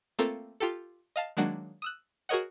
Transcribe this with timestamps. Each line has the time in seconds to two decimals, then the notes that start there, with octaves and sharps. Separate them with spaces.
0.19 A3 A#3 C4 F4 A4 A#4
0.60 F4 G4 A4
1.16 D#5 F5 A5
1.37 D#3 F#3 G#3 A#3 D4 F#4
1.82 D#6 E6 F#6
2.29 F#4 G#4 A#4 C#5 D#5 F#5